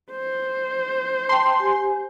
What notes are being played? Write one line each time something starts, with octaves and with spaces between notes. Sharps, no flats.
C5
G5 A5 C6
G4 G#5